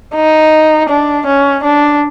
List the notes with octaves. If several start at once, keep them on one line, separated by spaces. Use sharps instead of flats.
D#4
D4
C#4
D4